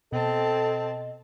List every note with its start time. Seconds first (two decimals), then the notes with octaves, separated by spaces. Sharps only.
0.12 B2 C4 A4 D#5 A5